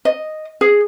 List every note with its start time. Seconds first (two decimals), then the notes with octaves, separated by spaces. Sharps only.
0.05 D#5
0.61 G#4